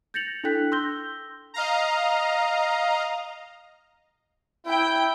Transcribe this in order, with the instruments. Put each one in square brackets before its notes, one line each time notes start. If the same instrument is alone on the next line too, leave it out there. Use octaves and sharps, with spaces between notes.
[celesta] G6 A6 A#6 C#7 F7 F#7
D4 E4 A4 G5 F#6 B6
C6 E6 G6 A#6 G7
[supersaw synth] D#5 F5 A#5
[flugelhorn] E4 [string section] G5